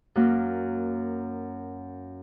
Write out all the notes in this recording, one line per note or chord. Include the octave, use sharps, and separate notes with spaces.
F#2 F#3 A#3